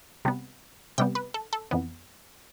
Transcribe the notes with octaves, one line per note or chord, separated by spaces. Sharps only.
C3 G3 B3
C3 G3 B3 G5
B4
A4
A4
F2 E3 B3